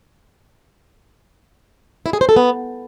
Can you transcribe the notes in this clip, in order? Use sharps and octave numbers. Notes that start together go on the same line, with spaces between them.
E4
G#4
C5
A4
B3